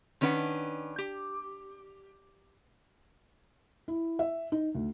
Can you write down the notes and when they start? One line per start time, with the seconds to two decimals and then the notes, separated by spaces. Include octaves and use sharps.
0.21 D#3 C#4 D4 B4 F#5
0.98 G4
3.88 E4
4.19 E5
4.52 D#4
4.75 D2